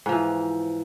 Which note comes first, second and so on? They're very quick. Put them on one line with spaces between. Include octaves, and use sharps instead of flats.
G#2 F3 E3